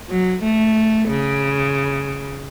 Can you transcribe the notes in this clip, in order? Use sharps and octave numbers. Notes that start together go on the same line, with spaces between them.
F#3
A3
C#3